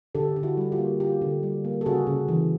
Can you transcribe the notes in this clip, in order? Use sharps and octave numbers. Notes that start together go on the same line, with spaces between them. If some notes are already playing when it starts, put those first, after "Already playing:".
D3 G4 A4
D3
E4 F#4
G3 F#4
F4 G4
A#3
D3 F4 G4
D3
G3
A#3
A4
C#3 F#4 G#4
C#3
E3